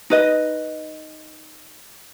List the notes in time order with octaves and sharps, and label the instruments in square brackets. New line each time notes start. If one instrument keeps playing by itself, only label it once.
[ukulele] D#4 B4 D#5